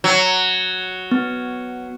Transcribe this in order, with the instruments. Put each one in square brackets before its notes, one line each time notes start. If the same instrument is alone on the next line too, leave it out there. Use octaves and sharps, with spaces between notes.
[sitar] F#3
[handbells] B3